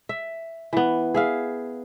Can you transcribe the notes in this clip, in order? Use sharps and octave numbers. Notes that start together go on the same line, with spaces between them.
E5
E3 B3
G#4 E5 F5